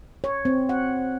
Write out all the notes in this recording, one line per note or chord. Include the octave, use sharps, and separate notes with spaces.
C#5
C4
F#5